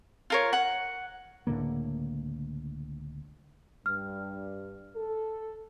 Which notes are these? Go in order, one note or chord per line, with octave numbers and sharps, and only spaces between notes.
F4 A#4 C#5
F#5
C#2 A2 D3 A#3
G2 F6
A4